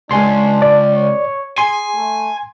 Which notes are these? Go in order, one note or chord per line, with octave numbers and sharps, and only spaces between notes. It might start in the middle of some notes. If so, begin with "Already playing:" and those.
C#2 G#3 D4 G#5 C6
D5
C#5
G#4 G#5 C6
A3